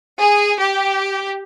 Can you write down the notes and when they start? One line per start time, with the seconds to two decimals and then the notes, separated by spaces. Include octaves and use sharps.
0.21 G#4
0.60 G4